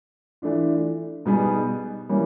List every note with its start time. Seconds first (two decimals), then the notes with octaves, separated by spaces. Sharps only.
0.42 E3 A3 D4 F4
1.25 B2 G3 B3 D#4 G#4
2.09 E3 G3 A#3 C#4